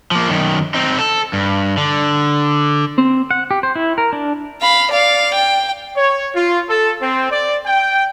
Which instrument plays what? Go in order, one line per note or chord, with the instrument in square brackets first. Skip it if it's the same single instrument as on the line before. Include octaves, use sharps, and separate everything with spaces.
[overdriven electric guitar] F3 A#3
F#2 D#3
C4 D#4
A4
G2
D3
[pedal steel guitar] C4
F#5
G4
C5
E4
A#4
D4
[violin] F5 B5
D5 F5
G5
[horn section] C#5
F4
A4
C4
D5
G5